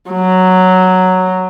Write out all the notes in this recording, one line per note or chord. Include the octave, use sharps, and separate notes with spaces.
F#3